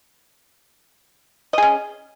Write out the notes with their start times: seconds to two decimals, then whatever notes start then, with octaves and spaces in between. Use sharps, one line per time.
1.53 D#5
1.58 G#4
1.62 C#4